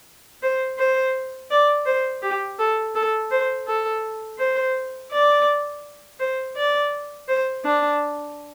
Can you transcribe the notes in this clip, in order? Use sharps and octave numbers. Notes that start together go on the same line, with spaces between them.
C5
C5
D5
C5
G4
A4
A4
C5
A4
C5
D5
C5
D5
C5
D4